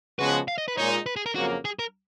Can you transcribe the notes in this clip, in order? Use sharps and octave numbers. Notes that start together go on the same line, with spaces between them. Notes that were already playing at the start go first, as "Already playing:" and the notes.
C#3 F3 G#3 B3 F#4 B4
F5
D#5
B4
A#2 G#3 D#4 C#5
B4
G#4
A#4
F2 C#3 F#3 A#3 F#4
G#4
A#4